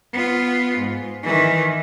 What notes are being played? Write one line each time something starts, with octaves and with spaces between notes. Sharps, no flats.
B3 F4
G#2
D#3 E3